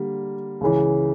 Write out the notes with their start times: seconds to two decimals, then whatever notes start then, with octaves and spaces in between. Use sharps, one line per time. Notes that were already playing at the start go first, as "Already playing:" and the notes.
Already playing: D3 G3 A#3
0.61 C#2 C#3 E3